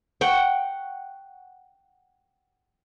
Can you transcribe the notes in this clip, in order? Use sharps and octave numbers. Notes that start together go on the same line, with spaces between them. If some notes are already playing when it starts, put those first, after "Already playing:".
F#5 G5 C#6